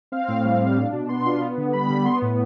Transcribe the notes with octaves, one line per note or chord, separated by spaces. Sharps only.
C4 F5
A2
G3
A2
D4 F5
B2
B3 C6
F4
B3
D3
G3 B5
D3
B3 C6
A2